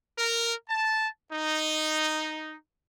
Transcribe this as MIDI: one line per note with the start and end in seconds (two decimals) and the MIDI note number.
0.17 0.51 70
0.67 1.06 81
1.29 2.54 63